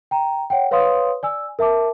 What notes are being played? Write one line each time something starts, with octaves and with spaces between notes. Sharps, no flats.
G5 A#5
C#5 F#5 G5
B4 C#5 F5 C6 D#6
D5 G#5 E6
A#4 E5 A5 D6